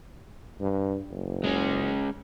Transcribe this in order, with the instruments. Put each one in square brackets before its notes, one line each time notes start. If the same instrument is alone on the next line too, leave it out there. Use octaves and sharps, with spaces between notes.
[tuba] G2
F#1
[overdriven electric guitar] G#3 C#4